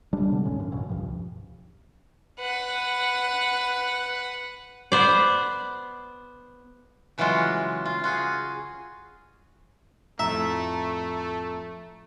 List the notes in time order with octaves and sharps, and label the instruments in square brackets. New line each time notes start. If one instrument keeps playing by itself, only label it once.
[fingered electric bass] D1 G3 G#3 D4
B2 D3
A1 D#2 G#2 C#4
F#2
A1 B2
C#2 G2 F3
[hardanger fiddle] B4 F#5
[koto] B3 C5 D5
C#3 E3 F#3 G#3 F4 F#4
F4
F4 F#4 G#4
[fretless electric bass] F2 A2 [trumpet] A3 [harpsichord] E5 [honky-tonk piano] A#5